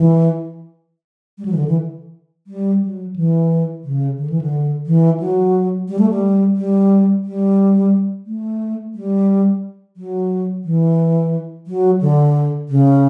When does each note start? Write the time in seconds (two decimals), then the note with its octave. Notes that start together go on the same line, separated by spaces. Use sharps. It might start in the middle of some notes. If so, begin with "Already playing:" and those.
Already playing: E3
1.38 G3
1.45 F#3
1.52 E3
1.57 D3
1.68 E3
2.47 G3
2.82 F#3
3.16 E3
3.84 C#3
4.18 D3
4.30 E3
4.41 D3
4.86 E3
5.20 F#3
5.88 G3
5.99 A3
6.10 G3
6.56 G3
7.24 G3
8.26 A3
8.95 G3
9.97 F#3
10.64 E3
11.67 F#3
12.01 D3
12.69 C#3